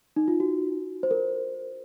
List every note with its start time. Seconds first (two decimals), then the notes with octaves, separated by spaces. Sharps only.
0.16 D#4
0.28 F4
0.40 F#4
1.03 C5
1.11 A#4